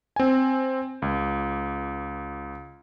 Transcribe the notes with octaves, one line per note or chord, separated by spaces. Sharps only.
C4 G#5
C#2